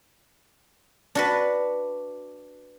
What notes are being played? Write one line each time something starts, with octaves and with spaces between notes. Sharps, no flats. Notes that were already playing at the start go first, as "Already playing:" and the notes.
D4 F#4 B4